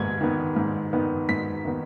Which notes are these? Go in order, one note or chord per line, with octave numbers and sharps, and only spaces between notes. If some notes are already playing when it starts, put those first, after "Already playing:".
Already playing: G#2 D#3 B3 G#6
D#3 B3
G#2
D#3 B3
G#2 B6
D#3 B3